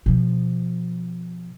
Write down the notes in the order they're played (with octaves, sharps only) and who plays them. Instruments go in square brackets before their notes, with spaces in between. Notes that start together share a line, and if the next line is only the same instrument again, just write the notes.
[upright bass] B2 F3